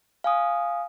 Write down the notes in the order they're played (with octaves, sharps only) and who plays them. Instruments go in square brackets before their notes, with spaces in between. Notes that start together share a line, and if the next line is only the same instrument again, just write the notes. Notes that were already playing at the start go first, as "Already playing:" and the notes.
[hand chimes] F5 G#5 D#6